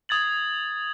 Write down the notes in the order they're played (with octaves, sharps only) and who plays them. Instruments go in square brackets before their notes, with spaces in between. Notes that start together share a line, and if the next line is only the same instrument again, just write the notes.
[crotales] D#6 G#6 A6 F#7